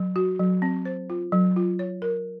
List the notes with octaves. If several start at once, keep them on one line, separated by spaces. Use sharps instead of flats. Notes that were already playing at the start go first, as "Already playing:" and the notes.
Already playing: F#3
F#4
F#3
C4
C5
F4
F#3
F4
C#5
A#4